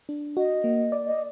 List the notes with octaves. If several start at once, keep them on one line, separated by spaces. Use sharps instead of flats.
D4
F#4 D#5
A#3
D5
D#5